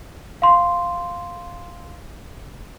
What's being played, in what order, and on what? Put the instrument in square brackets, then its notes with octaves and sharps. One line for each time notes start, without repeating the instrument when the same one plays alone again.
[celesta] F5 C6